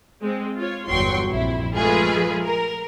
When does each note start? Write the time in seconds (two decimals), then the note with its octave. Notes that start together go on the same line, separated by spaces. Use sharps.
0.23 G#3 C4
0.57 F4 C#5
0.90 G1 E2 F#3 G5 C6 C#6
1.30 A#1 F2 E4
1.75 F3 G#3 A3 F4 G#4 B4
2.42 A#4